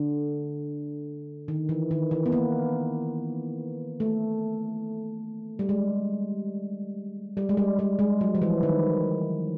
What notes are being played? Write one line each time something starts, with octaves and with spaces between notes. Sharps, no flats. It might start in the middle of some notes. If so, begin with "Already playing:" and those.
Already playing: D3
D#3
E3
D#3
E3
B3
A#3
A3
G3
G#3
G3
G#3
G3
G3
G#3
F#3
F3
E3
D#3